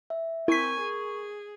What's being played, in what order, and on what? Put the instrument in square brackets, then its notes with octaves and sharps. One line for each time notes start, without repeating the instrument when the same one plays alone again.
[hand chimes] E5
[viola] C4 G#5 [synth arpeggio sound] E4 B6 [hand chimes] A#4 C#6
[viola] G#4